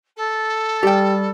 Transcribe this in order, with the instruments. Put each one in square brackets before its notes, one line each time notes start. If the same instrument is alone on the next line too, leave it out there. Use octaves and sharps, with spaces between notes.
[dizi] A4
[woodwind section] G3 [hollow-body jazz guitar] G4 G5